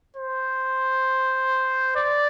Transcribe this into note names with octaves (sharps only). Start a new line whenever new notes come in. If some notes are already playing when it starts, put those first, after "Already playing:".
C5
D5